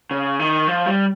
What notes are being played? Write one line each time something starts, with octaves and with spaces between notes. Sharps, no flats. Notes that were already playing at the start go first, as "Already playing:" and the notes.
C#3
D#3
F3
G3